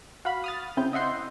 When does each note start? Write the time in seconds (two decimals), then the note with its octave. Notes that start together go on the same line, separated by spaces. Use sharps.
0.25 F#4 F5 B5
0.44 D#6 F6 A6
0.77 C#3 C4 E4 G6
0.93 D#5 E5 F#5 C6 G6